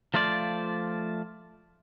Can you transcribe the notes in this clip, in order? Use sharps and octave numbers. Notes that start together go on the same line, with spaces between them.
F3 A3 F4 C5 D5